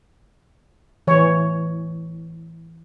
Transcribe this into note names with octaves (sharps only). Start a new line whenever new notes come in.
E3 C#5